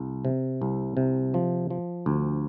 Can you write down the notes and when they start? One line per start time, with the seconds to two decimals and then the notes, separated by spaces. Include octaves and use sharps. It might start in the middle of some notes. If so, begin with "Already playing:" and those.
Already playing: C2
0.25 C3
0.62 C2
0.97 C3
1.34 F3
1.70 F3
2.06 D2